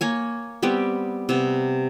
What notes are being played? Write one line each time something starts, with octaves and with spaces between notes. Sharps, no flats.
A#3 C#5 G#5
G3 B3 C4 G4
C3 B3